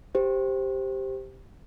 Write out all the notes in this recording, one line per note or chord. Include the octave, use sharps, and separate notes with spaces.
G4 C5